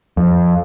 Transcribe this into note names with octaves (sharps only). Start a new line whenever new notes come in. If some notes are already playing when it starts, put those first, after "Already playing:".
F2